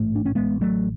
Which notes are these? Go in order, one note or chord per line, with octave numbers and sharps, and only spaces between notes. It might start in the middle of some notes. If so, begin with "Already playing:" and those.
Already playing: A1 G#2 A3
D4
C#4
A1 A2 G#3 B3
F#3 A3